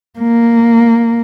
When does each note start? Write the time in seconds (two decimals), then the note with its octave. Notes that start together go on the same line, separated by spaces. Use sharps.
0.20 A#3